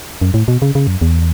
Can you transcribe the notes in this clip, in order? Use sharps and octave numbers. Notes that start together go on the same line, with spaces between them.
F#2
A2
B2
C#3
C#3
F#2
E2